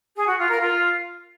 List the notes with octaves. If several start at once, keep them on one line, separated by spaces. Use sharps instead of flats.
G#4
F#4
F4
A#4
F4